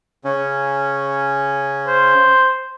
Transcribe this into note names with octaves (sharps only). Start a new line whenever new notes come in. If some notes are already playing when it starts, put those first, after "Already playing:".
C#3 C#4
C5